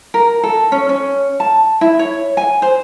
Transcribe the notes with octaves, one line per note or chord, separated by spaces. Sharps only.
A#4
A4
C#4
C#4
A5
E4
C#5
G#5
C5